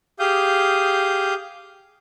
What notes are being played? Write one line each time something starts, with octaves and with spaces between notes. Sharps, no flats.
G4 G#4 F5 D#6 G6